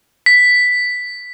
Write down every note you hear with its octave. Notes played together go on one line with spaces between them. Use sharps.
B6